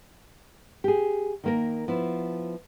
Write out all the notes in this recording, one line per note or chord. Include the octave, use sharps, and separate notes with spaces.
G4 G#4
D#3 A#3 A#4
F3 B3 E4